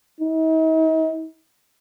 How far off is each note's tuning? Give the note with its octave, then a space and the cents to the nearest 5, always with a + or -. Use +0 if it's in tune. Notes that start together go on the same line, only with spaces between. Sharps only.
D#4 +45